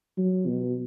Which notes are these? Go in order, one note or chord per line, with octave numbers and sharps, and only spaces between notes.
F#3
B2